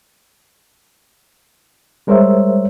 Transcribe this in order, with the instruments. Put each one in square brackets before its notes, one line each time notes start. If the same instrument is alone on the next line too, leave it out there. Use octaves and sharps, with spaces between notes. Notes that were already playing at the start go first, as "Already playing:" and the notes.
[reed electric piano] G3 G#3 A#4 C5 C#5 E5